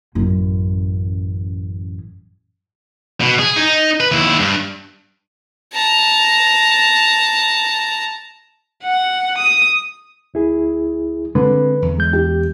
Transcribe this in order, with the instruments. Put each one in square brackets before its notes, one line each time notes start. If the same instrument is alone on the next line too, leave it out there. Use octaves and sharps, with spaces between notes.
[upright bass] A1 F#2
[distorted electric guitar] B2
G#4
D#4
B4
D#2 E4
G2
[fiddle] A5 A#5
[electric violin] F#5
D#6
[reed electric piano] D2 E4 G#4
[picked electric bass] D3 [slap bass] G#3 C4 [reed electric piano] B4
[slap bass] E2
[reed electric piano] G#3 G6
[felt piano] G4